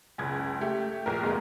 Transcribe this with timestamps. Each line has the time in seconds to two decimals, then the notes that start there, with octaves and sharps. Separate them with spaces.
0.18 F#1 C#2 G#6
0.61 A3 G4
1.06 A#1 A#4
1.23 F1 D2 G#3 A#3 A#5